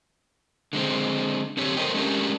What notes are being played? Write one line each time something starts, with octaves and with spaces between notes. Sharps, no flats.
D3 G#3 C4
F#2 D3 C4 G4 C#5
A4 A#4 C5 C#5 D#5 G5
G#3 A3 C#4 D4 G4 A#4